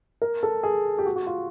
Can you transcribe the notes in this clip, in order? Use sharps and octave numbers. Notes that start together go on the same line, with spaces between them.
A#4
A4
G#4
G4
F#4
F#4
F4